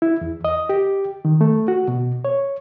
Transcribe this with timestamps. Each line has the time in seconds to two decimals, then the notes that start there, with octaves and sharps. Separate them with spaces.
0.02 E4
0.21 E2
0.45 D#5
0.69 G4
1.25 D#3
1.41 A3
1.68 F#4
1.88 B2
2.25 C#5